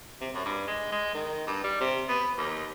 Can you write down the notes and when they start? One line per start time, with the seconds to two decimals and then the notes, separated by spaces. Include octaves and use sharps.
0.21 C3
0.34 F#2
0.45 G2
0.67 G#3
0.92 G#3
1.14 D#3
1.47 G2
1.64 G3
1.81 C3
2.09 B3
2.37 D#2